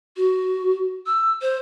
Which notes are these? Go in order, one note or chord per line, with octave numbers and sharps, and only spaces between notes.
F#4
E6
C5